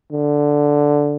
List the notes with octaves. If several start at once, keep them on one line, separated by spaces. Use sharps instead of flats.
D3